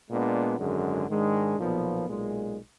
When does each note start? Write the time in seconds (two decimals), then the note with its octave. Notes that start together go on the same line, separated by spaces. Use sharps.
0.08 A#2 G#3 B3 D4
0.58 G#1 F#2 D3 G#3
1.08 G#2 D#3 G#3 D4
1.57 B1 A#2 F3 B3
2.08 B1 A#2 G#3